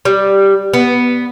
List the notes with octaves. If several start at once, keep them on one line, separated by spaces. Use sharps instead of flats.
G3
B3